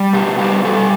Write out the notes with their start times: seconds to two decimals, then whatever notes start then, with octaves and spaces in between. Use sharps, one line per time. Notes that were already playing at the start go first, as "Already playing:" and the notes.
Already playing: G3
0.13 B2 G4
0.39 G3 G4
0.65 G3 A4